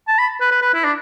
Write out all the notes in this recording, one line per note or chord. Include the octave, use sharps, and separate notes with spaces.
A5
B5
B4
B4
B4
E4
D4